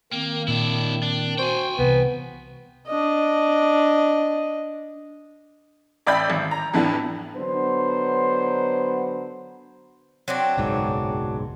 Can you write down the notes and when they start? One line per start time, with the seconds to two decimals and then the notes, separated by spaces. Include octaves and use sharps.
0.12 D#3 A#3 C4
0.48 A#2 D4 E4
1.03 D4
1.38 F#4 C5 G5 G#5
1.79 C2 C3 E3 B3
2.88 D4 D#5
6.07 A1 D5 E5 G5 B5 G6
6.30 G#1
6.51 A#5
6.74 F2 A2 E3 B3 D4
7.36 D3 F#3 B3 D4 C5
10.28 F#3 C4 D4
10.57 F#1 B1 G#2